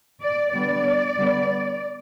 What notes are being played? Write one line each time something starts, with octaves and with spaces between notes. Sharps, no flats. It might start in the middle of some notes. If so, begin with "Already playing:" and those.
D5
D3 G3 B3 D5
D3 G3 B3